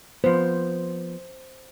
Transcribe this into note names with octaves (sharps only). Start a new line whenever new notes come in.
F3 B3 C5